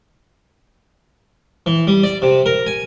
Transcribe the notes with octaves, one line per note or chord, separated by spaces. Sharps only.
E3
G3
D5
C3
A#4
G#5